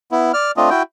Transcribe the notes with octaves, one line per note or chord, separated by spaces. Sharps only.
B3 E4
D5 F6
A3 C4 D4 F4 D#5
E4 F#4 G5